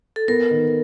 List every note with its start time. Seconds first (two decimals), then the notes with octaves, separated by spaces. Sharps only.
0.16 A4
0.28 B3 A#4
0.51 D#3